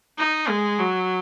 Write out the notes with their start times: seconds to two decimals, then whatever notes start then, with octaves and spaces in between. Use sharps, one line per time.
0.18 D#4
0.48 G#3
0.79 F#3